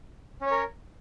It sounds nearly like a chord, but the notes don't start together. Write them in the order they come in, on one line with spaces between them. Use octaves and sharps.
C#4 C#5 A#4